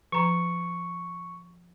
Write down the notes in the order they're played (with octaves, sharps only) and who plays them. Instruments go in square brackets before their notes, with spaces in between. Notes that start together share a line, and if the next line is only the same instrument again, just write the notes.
[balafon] F3 A#5 [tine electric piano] C#6